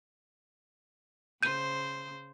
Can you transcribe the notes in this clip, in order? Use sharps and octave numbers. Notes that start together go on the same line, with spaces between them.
C#3 C5 G6 D#7